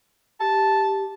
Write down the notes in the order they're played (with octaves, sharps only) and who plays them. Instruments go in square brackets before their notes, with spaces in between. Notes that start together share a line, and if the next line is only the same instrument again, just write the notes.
[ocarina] G4 [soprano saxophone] A5